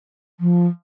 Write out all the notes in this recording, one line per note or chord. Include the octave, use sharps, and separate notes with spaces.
F3